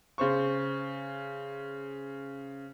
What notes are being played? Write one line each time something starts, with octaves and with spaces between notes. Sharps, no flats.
C#3 C5 C#6